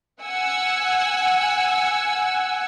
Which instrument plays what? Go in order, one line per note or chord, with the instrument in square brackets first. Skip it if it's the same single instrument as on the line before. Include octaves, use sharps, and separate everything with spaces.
[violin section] F#5 G#5 E6